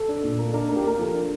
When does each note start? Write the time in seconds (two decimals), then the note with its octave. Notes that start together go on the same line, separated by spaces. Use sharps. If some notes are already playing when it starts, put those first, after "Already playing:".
Already playing: A4
0.08 D4
0.24 A#2
0.39 A#3
0.53 D4 A#4
0.69 A#3
0.76 G4
0.83 A#3 A#4
0.99 F3 A4
1.14 D4